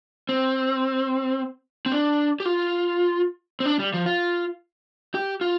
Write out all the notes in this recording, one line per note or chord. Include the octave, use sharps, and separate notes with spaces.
C4
C4
D4
G4
F4
C4
D4
G3
F3
F4
G4
F4